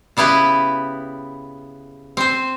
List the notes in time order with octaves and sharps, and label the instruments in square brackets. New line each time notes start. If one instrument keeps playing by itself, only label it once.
[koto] C#3 B3 E4 G4 B4
C4 C5